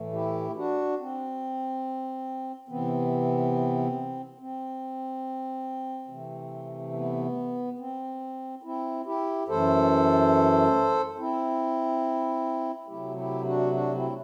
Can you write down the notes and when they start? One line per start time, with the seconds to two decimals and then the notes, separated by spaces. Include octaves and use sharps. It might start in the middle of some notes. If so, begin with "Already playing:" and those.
Already playing: A2 E3 A3
0.13 E4 G4
0.56 D4 F#4
0.99 C4
2.69 C3 E3 B3 C4
4.39 C4
6.08 C3 E3 A3
6.93 B3
7.79 C4
8.63 C4 E4
9.05 E4 G4
9.48 F#2 E3 A3 A4 C5
11.18 C4 E4
12.88 C3 F#3 A3 E4 G4
13.17 E4 G4
13.45 D4 F#4
13.73 D4 F#4
13.94 C4 E4